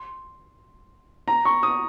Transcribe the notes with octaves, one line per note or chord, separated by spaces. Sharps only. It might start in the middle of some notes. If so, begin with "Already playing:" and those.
Already playing: C6
A#5
C#6
D#6